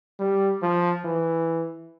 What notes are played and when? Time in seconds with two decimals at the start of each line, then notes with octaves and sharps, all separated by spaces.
0.19 G3
0.62 F3
1.05 E3